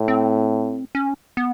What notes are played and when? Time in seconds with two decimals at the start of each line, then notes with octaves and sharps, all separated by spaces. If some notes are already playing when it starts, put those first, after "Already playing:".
Already playing: A2
0.08 C4
0.95 C#4
1.37 B3